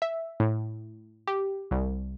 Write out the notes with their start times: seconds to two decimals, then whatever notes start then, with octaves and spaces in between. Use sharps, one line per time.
0.02 E5
0.40 A2
1.27 G4
1.71 C2